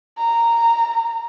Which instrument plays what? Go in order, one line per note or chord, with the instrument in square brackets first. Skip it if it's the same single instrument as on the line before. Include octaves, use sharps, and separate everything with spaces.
[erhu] A#5